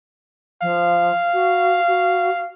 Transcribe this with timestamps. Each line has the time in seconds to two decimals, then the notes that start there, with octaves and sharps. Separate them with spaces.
0.62 F3 F5
1.33 F#4
1.88 F#4